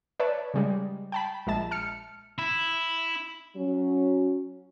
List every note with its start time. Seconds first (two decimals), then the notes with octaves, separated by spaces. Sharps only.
0.20 B4 C#5 D5 E5 A5
0.54 C#3 G3 G#3
1.12 G5 A5 B5
1.47 A#1 G#3 E5 A5
1.71 A5 F6 C#7
2.38 E4
3.56 F#3 C#4